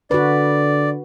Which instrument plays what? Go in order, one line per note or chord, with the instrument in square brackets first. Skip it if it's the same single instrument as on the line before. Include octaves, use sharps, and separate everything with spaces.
[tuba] D3 [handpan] F#4 B4 [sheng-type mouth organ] D5